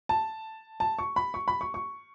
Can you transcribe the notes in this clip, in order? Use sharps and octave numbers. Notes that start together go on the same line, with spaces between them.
A5
A5
C#6
B5
C#6
B5
C#6
C#6